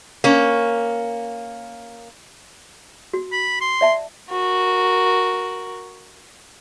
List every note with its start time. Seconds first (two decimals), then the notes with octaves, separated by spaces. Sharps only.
0.24 A#3 C#4
3.14 F#4
3.32 B5
3.61 C6
3.81 D5 E5 A5
4.29 F#4 A#4